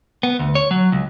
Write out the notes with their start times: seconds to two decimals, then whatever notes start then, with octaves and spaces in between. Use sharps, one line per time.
0.23 B3
0.39 D2
0.55 C#5
0.71 F#3
0.92 C#2